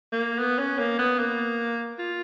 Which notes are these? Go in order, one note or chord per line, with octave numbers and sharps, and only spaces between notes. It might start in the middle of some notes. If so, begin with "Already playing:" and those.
A#3
B3
C#4
A#3
B3
A#3
F4